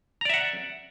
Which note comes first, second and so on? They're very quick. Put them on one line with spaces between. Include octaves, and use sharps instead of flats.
A#5 D5 E5 F#5